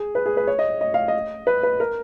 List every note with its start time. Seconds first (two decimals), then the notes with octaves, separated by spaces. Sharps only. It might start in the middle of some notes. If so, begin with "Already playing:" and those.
Already playing: G#4
0.15 B4
0.26 G#4
0.37 B4
0.47 C#5
0.59 D#5
0.81 D#5
0.94 F5
1.08 D#5
1.47 B4
1.63 B4
1.80 A#4